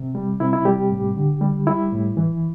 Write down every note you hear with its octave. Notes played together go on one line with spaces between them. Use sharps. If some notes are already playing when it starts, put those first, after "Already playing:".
Already playing: C3
G3
C3 E4
E4
G3 G4
A2
D3
G3
G3 E4
A2
E3